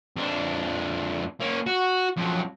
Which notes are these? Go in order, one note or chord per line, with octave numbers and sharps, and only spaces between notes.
F2 D4
A#3 C#4
F#4
F2 F#3